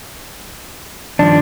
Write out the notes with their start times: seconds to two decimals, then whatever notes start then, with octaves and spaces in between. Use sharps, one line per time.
1.19 G2 D#3 F3 D4